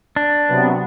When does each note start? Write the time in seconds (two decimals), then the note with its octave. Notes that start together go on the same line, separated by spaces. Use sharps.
0.16 D4
0.48 C3 F#3 B3